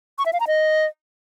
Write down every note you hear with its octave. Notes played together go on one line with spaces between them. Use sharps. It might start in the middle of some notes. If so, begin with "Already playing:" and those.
C#6
E5
F5
A#5
D#5